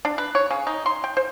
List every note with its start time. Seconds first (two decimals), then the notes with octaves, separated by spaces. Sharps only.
0.05 D4
0.18 B4
0.35 C#5
0.51 C#3
0.67 D#4
0.86 C6
1.04 G5
1.17 C5